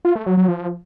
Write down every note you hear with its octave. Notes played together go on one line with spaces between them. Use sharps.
F4
A3
F#3
F#3
F3